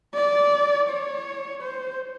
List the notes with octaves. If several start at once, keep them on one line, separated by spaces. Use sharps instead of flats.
D5
C#5
C5